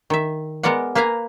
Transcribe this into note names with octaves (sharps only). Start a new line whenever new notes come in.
D#3 E5
G#3 B3 A#4 D5 F#5
A#3 B4 F5 G#5 A#5